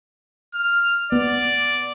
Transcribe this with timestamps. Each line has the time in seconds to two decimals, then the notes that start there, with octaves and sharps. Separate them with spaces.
0.55 F6
1.12 B3 D5